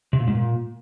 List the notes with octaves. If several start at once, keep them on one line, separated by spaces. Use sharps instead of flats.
C3
A#2
G#2
A#2